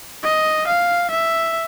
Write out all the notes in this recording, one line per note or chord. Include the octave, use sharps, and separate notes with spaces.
D#5
F5
E5